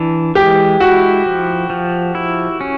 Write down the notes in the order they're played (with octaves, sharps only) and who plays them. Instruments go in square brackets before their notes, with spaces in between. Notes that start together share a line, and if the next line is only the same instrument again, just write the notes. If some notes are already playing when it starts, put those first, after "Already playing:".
Already playing: [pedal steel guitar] E3 D4
[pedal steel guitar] G#3 [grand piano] G4
[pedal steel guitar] E4 [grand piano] F#4
[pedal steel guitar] F3
F3
E4
C#4